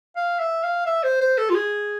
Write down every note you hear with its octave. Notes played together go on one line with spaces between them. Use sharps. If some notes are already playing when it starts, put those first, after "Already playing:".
F5
E5
F5
E5
C5
C5
A4
F4
G#4